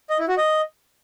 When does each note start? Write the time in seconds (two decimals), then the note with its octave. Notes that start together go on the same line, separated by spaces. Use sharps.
0.10 D#5
0.19 E4
0.28 F#4
0.37 D#5